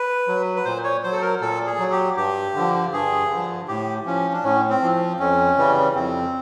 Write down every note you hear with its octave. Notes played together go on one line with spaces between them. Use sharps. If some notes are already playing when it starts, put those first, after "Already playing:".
Already playing: B4
F#3
B4
A#2 C5
C#5
F#3 C5
A4
A#4
A#2 A4
G#4
F#3
G4
G2 G4
D3 F3
G2 G#4
D3 F3
A2 G4
F3 C#4
D4
A2 C#4
C4
F3
F2 C#4
C#3 E3 G3
F2 C4